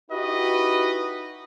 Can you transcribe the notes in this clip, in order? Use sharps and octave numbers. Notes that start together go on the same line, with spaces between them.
D#4 E4 F#4 G4 B4 D#5